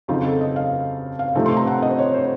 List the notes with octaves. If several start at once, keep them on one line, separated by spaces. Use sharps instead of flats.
F2 C#3 F#3 C4 D#4 F4
A4
D#5
F5
F5
C3 F3 A3 C4 D#4
C6
A#5
F#5
D#5
C5
C#5
C5